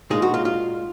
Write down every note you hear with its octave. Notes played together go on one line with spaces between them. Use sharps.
A#2 G#3 D#4 F4 G#4
F#4
F4
F4